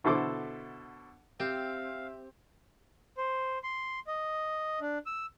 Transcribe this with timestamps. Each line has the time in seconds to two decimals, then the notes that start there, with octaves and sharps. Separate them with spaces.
0.04 B2 D3 E4 A4 C5 D6
1.40 C4 G4 E5 F5
3.17 C5
3.63 C6
4.07 D#5
4.81 D4
5.06 E6